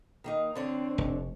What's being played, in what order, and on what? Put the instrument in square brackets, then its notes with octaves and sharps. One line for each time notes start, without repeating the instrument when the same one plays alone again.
[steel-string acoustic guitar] D#3 A#3 D#4
[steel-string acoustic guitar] D3 D4 C#5 [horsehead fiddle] C4
[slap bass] F1